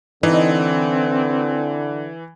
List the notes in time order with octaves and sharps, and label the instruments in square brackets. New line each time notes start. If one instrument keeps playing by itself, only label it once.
[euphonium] D3 [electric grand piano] E3 [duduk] C4 [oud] D#4